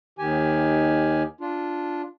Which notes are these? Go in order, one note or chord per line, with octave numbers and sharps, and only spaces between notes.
D#2 D#3 G4 G#5
D4 F4